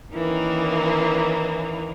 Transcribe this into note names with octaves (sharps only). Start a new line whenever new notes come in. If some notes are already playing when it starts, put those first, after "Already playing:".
D#3 E3 A#3 C#4